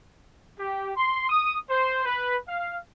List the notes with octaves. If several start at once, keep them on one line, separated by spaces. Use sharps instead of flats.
G4
C6
D#6
C5
B4
F5